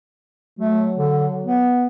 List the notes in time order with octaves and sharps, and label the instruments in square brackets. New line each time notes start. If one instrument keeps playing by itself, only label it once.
[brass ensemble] F#3 [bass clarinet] A3
[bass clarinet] D3
B3